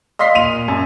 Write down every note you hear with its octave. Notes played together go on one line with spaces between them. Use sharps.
D#5 F5 C6 B6 C7
A#2 D#7 F7
F#2